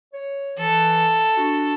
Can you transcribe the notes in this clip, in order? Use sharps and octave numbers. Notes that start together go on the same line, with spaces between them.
C#5
E3 A4
D4 F#4